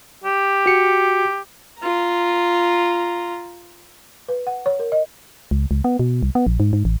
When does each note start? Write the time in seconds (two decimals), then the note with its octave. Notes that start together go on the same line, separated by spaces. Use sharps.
0.24 G4
0.66 F#4 C#7
1.79 F4 A#5
4.28 B4
4.47 F#5
4.66 C#5
4.80 A#4
4.92 D#5
5.51 C#2
5.71 C#2
5.84 B3
5.99 B2
6.23 C2
6.35 B3
6.47 A#1
6.60 G#2
6.73 G#2
6.85 A1